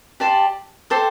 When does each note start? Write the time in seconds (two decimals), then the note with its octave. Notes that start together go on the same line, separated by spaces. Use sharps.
0.20 G4 D5 A5 C6
0.90 A4 C5 G5 D6